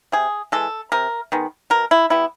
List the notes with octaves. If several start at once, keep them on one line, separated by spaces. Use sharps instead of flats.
C3 G#4
E3 G#3 A4
C3 A#4
D#3 G#3 B3
B2 A#4
E4
G3 B3 E4